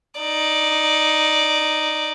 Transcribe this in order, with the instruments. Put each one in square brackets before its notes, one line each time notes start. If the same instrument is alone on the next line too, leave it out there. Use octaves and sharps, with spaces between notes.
[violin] D#4 D5